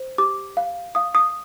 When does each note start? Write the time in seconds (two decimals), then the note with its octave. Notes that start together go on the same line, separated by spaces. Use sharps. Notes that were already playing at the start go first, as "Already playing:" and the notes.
Already playing: C5
0.18 G4 D6
0.57 F5
0.95 F5 D#6
1.15 D#6